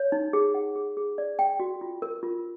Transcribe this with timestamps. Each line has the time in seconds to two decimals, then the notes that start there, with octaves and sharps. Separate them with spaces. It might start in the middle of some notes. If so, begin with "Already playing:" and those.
Already playing: C#5
0.12 D#4
0.33 G#4
0.54 F#5
0.76 G#4
0.97 G#4
1.18 D5
1.39 G5
1.60 F#4
1.81 F4
2.02 A#4
2.23 F4